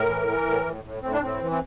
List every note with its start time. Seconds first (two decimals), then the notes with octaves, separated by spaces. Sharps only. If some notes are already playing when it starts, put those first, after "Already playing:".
Already playing: A2 A#4
0.08 E3
0.27 E3
0.46 A2
0.65 A2
0.84 A2
1.03 A2 C4
1.12 D4
1.21 A2 C4
1.41 E3
1.51 C4